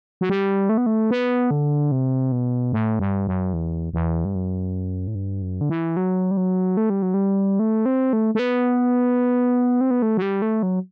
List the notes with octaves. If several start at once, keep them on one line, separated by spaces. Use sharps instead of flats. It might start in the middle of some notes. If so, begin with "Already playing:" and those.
F#3
G3
A3
B3
A3
B3
D3
C3
B2
A2
G2
F#2
E2
E2
G2
F#2
A2
G2
F#2
D3
E3
F#3
G3
F#3
A3
G3
F#3
G3
A3
C4
A3
A3
B3
C4
B3
A3
F#3
G3
A3
F#3